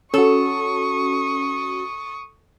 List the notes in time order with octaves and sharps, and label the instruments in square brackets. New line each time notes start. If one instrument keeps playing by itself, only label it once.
[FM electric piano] C#4 F#4 [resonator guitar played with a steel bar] A4 [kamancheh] C#6 D#6